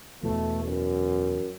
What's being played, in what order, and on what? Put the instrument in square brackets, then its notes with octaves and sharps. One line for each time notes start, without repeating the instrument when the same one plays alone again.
[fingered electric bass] E2 B2 E3 [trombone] A3
[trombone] F#2